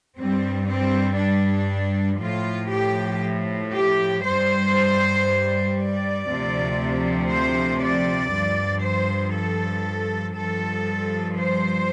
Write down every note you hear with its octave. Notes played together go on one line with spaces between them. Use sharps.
G2 G3 C4
C4
D4
A2 F3 F4
G4
G4
G2 G3 C5
D5
D2 C3 F3
C5
D5
G2 F3
C5
A4
G2 F3 A4
C5